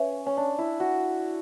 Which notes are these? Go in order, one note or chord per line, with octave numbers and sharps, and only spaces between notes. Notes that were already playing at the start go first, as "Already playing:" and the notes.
Already playing: C#4 B4 E5
C#4
D4
E4
F#4